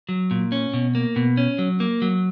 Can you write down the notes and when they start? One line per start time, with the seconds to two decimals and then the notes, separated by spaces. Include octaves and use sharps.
0.09 F#3
0.31 A#2
0.52 C#4
0.74 B2
0.95 A#3
1.16 B2
1.37 C#4
1.59 F#3
1.80 A#3
2.02 F#3